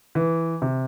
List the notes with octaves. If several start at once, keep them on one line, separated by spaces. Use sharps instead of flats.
E3
C3